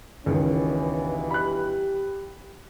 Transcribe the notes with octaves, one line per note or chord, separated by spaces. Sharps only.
C#2 G2 B2 D#3 E3 C#4
G4 B5 F#6